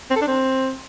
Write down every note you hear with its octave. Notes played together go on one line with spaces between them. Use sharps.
C4
A4
D4
C4